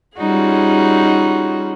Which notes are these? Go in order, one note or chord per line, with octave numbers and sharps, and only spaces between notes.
G3 C#4 D#4 F4 F#4 G#4